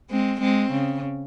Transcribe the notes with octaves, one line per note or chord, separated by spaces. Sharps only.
G#3 C4
G#3 C4
C#3